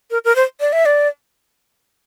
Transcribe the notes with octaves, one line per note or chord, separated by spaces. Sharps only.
A#4
A#4
C5
D5
E5
D5